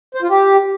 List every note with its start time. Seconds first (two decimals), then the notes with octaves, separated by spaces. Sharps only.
0.15 C5
0.22 F4
0.30 G4